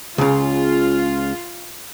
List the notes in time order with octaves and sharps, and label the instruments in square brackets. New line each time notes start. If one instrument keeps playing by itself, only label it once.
[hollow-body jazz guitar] C#2 C#3 [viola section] F4